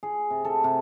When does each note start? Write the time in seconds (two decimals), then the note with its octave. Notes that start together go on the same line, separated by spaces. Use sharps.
0.03 G#4
0.31 C3
0.45 A4
0.64 C3